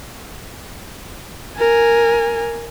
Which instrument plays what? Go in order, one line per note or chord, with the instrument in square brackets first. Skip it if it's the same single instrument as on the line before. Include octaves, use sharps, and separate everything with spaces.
[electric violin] A#4 G#5